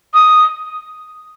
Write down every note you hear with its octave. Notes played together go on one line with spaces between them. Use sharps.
D#6